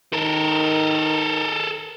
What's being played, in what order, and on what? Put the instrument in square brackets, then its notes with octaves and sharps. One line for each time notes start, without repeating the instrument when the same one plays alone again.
[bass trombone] D#3 [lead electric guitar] A4 A#4